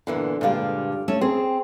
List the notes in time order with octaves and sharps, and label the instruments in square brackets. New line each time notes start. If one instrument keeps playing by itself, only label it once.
[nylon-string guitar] A#2 E3 B3 [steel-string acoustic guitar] D3
[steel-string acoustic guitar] G2 F5 [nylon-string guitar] A#2 D3 G#3
[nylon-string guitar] A3 C#4 E5
[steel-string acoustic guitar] C4 [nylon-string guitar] G#4